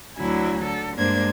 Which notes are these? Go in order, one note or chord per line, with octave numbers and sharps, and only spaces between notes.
D2 D3 F#3 E4 G#5
D3 A4
G2 G#3 A#3 D4 C5 G#6